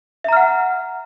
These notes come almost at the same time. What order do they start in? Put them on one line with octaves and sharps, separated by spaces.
E5 A#5 F6 F#5